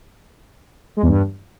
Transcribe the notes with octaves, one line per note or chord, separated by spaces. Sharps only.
G#3
E2
G2